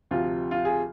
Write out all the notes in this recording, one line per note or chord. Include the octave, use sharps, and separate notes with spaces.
D2 C3 F3 F4
F4
G#4